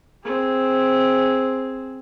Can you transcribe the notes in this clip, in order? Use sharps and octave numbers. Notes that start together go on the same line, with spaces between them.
C4 G#4